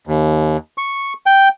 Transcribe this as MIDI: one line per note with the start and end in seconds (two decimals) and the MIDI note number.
0.07 0.57 39
0.78 1.13 85
1.26 1.49 79